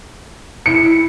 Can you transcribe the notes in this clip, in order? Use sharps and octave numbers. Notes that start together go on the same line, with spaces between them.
E4 C#7